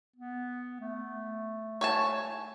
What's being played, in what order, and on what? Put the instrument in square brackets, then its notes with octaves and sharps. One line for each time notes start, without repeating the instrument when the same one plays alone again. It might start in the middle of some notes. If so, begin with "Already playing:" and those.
[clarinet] B3
A3
[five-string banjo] C#5 G#5 A5